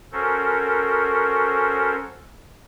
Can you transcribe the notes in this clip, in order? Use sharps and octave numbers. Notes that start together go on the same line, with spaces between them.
C#4 F#4 A4 A#4 C5